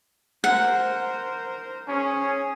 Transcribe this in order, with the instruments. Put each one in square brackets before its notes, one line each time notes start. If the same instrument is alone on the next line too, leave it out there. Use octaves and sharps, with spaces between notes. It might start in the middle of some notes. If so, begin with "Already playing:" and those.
[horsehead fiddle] A#4 C5 [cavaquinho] F#5
[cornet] C#4 [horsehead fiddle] G#4